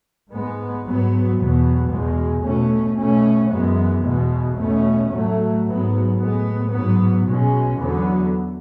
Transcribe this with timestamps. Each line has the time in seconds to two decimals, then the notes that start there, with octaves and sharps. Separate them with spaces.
0.30 G#2 G#3 B3
0.83 G#2 F#3 B3
1.36 E2 B2 F#3 B3
1.90 E2 B2 G#3
2.43 B2 A3 C#4
2.97 B2 A3 C#4
3.50 F#2 E3 G#3 B3
4.04 E2 B2 G#3 B3
4.58 E2 B2 A3 C#4
5.11 A2 F#3 A3
5.65 G#2 F#3 B3
6.18 A2 G#3 B3
6.71 G#2 F#3 B3
7.25 B2 G#3 C#4
7.78 E2 D3 F#3 B3